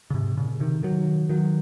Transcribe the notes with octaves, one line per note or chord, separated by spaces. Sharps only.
C#3
G#2 C3
A#2 C#3
C3 D#3
D#3 F#3
D#3 F#3